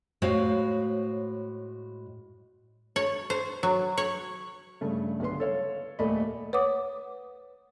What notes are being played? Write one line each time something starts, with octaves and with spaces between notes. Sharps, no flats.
A2 G#3 F#4 C5 C#5 F5
C#5
C5
F#3
C#5
G2 C#3 A3
B1 D3 B4 C6
A4 C#5 F5
D#1 A3 A#3 D5 D#5 B5
B4 C#5 F#5 D6 D#6